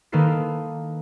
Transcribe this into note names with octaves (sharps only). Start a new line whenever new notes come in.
D#3 A#3 D#4 A4 B4 C7